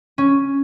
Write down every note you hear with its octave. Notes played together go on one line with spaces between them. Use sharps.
C#4